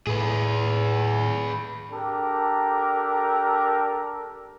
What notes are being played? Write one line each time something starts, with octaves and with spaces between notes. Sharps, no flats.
A2 G#4 B4
D4 G4 A4 A#4